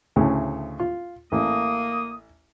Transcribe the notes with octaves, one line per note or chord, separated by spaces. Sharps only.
D2 A2 C#3
F4
A1 A#3 D#6